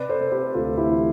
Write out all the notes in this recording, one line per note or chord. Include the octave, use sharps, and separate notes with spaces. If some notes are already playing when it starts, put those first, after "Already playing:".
Already playing: C3 B4 D5
A4 C5
C3
G4 B4
D2 F4 A4
E4 G4
E3